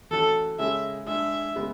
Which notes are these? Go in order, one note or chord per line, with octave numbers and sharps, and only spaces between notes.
E3 A3 C#4 F#4 A4
C#3 G#3 C#4 G#4 E5
G#3 D4 G#4 E5
C#3 G#3 B3